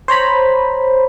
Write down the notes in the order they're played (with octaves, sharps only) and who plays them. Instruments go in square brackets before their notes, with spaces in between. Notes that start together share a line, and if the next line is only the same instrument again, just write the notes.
[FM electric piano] C5 C#5 A#5 B5